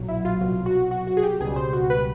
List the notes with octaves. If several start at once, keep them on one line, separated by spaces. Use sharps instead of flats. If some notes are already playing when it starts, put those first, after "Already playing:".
Already playing: B1 A#2 F#3
E4
F4
C2 B2 F#3 F4
F#4
F#4
F#4
G#4
G4
C#2 B2 G3 G#4
C5
F#4
B4